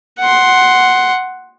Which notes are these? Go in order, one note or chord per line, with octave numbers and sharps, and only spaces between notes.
F#5 C6